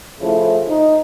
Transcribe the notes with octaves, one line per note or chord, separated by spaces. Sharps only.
C#3 F3 A3 E4
D#4